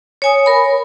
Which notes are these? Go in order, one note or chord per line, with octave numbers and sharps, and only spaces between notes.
C#5 G#5 D#6
A#4 B5